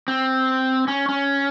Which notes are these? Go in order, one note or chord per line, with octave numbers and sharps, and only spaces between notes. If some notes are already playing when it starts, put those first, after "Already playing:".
C4
C#4
C#4